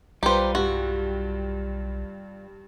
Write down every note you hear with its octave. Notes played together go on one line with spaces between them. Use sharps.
B1 G3 F4 G4 B4 C5 A#5
G2 F#4